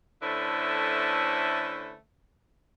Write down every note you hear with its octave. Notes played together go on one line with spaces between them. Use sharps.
D3 A3 C#4 E4 B4 C5